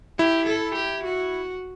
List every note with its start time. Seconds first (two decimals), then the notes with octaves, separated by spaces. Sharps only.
0.18 E4 G4
0.47 A4
0.76 G4
1.05 F#4